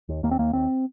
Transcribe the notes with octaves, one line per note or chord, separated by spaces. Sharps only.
D#2
D#2 A#3
C4
D#2 A#3
D#2 C4